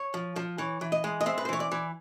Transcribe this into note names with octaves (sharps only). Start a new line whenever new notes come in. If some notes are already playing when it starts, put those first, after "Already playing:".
Already playing: C#5
F3
F3
E3 C#5
E3
D#5
G#3
D#5
C4 E5
B4
C5
E3 C#5
D5
E3